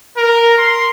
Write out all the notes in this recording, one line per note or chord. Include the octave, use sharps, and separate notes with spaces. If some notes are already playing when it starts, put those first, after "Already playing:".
A#4
C6